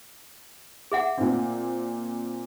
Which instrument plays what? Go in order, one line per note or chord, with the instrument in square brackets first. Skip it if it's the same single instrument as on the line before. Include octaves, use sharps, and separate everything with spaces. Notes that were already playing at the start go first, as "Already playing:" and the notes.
[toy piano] G#4 E5 F#5
[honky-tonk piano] A#2 C4